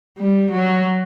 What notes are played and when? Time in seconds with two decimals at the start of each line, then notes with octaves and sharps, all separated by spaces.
0.18 G3
0.52 F#3